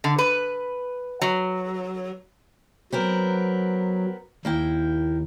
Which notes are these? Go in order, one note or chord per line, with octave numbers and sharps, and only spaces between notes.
D3
B4
F#3
F#3 B3 C4 A#4
D#2 A#3 E4 G5